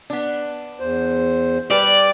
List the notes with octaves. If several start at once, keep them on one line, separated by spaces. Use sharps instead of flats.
B3 D4
E2 C5
G3 B4 D5